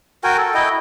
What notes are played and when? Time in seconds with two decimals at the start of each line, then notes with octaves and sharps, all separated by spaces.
0.24 F#4 A#4 G5 G#5
0.38 A4
0.54 E4 D#5 G5